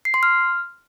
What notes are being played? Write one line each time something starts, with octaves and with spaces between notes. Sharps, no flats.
C7
C6
F6